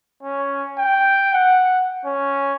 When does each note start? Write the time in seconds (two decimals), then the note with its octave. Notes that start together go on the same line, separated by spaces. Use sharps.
0.23 C#4
0.78 G5
1.34 F#5
2.05 C#4